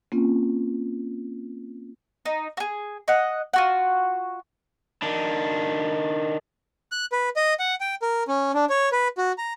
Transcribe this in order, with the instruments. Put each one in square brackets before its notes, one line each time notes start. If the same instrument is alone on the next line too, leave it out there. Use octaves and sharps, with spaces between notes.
[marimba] A#3 C4 C#4 F4
[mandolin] D#4
F#4 G#4
D#5 F#5
F4 F#4 F#5
[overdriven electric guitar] D#3 D4
[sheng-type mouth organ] F#6
B4
D#5
F#5
G5
A#4
C#4
D4
C#5
B4
F#4
A#5